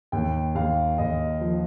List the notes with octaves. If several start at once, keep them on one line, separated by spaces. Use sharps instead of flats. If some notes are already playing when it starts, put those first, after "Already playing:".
D#2 G5
D#2 F5
D#2 D#5
F3